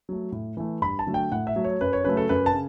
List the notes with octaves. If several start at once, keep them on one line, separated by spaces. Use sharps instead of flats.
F#3 A3
A2
E3 A3
G2 B5
A5
D3 F#3 A3
G5
A2 F#5
E5
F#3 A3
C#5
F#2 B4
C#5
C#3 F#3 A3 B4
A4
F#2 B4
A5
C#3